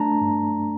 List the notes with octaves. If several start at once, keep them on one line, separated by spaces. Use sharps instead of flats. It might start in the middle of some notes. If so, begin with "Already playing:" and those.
Already playing: A3 D4 A5 A#5
G2